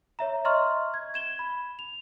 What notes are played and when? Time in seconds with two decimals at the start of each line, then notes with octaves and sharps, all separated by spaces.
0.19 C#5 E5 A#5
0.45 D#5 E5 A#5 C6 C#6 F6
0.94 G#6
1.14 G#6 E7 G7
1.39 B5
1.79 F7